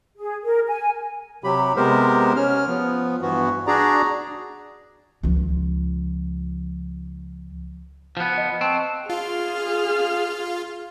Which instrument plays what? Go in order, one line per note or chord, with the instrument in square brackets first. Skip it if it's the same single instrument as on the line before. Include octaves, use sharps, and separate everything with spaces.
[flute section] G#4
A#4
G#5
[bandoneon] C3 F#3 G4 B5
C3 G#3 B3 G4 A#4 C5
C#4 F6
F3 B3
G2 E3 B3 F#4
D4 F#4 G#4 D5 A#5
[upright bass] C#2 F3
[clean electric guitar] F3 B3
[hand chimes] D#5
[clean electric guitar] C4 [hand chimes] A5 C#6
[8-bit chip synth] F4 [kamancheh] G#4 F6 [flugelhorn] F5